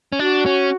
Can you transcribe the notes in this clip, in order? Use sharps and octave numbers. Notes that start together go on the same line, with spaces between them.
C#4
D4 F#4
C#4